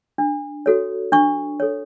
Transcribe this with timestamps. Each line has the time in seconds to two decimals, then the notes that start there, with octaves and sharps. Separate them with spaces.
0.18 D4
0.66 F#4 A4 C#5
1.12 D4 C#6
1.60 A4 C#5